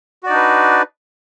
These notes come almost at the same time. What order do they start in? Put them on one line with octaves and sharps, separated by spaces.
F#4 D5 D#4 D4 B4